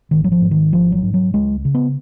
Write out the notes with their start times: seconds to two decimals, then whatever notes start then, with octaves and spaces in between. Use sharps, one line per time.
0.11 G#1 D#3
0.24 F#3
0.32 F3
0.41 G#2
0.51 D#3
0.72 G#1 F3
0.92 F#3
1.02 G#2
1.14 F#3
1.34 C#2 G#3
1.65 C#3
1.74 B3